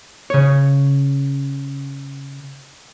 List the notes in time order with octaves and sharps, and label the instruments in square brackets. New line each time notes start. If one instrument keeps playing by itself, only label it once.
[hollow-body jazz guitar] C#3 C#5